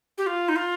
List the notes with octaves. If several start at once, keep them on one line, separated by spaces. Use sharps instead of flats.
G4
F4
D#4
F4